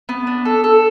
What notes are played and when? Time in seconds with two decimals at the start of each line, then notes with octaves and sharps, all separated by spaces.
0.09 B3
0.27 D4
0.45 A4
0.64 A4